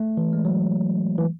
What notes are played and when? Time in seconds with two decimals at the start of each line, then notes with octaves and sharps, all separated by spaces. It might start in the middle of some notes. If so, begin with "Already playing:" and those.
Already playing: A3
0.17 E3
0.33 G#3
0.45 F#3
1.18 E3